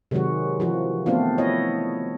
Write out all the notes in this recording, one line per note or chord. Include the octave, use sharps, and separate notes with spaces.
C3 D#3 F#3 G#3 F#4
E3 F3 F#4
A3 B3 C4 D4 F4
E4 C#5 D#5